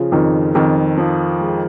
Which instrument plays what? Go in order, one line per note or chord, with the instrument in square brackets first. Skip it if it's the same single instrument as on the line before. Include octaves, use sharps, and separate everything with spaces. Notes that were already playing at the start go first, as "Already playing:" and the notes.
Already playing: [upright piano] C#3 [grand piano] F3
[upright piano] F2 [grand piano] D#3
[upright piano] F2 [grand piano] D#3
[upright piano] F3
G#3